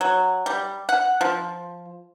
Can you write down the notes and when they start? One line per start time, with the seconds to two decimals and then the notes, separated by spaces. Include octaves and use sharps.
0.01 F#3
0.46 G3
0.89 F#5
1.21 F3